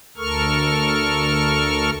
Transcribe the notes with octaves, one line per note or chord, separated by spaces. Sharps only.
D2 A4 A#4 C#6 F6